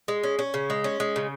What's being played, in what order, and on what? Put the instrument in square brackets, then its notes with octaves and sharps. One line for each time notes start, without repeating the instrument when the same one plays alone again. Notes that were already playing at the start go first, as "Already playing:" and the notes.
[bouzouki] G#3
C#4
C#4
C#3
G#3
C#4
G#3
C#3